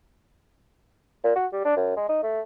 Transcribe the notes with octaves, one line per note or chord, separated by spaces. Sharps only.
A#2
F#4
G3
D4
F#2
G#3
D#4
A3